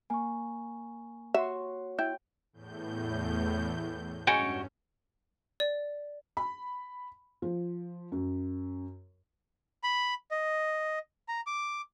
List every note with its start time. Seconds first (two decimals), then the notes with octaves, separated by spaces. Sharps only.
0.10 A#3 G#5 C#6
1.34 F#4 C#5 E5 C6
1.99 E4 G5 G6
2.53 E2 A2 G6
4.27 G2 C#3 G#3 C#4 F#4 C#5 G5 G#5
5.60 D5
6.37 B5
7.42 F3
8.12 F#2
9.83 B5
10.31 D#5
11.28 A#5
11.47 D6